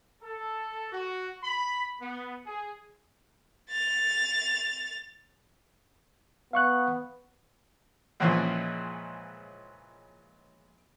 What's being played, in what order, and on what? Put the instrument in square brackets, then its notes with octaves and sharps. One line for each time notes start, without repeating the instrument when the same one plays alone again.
[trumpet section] A4
F#4
B5
B3
G#4
[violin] A6 F7
[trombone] B3 [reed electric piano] F5 C#6 F#6
[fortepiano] C#2 A#2 E3 F3 C#4